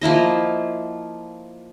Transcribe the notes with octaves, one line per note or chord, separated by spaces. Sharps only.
F3 A#3 E4 D#5